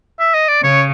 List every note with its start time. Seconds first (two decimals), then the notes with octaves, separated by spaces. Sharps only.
0.19 E5
0.34 D#5
0.48 D5
0.63 C#3 C#5